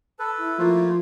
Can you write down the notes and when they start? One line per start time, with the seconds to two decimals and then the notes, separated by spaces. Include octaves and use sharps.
0.19 A4 B4 A5
0.38 E4
0.59 F3 A3 A#3 F4